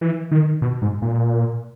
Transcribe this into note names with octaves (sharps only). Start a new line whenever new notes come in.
E3
D#3
B2
G#2
A#2